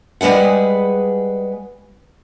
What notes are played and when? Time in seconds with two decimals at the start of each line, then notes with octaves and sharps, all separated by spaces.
0.21 G3 G#3 G#4 B4 F#5